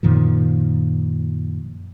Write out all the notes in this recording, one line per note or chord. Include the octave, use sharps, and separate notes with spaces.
F#2 A#2 D#3 F3